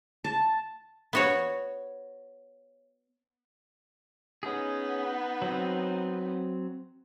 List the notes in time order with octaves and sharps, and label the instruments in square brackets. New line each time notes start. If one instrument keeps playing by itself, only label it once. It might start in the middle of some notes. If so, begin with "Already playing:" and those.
[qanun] A5
[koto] B3 F#4 C#5
[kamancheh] B3 D#4 [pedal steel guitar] C#4 G#4
[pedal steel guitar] F#3 C4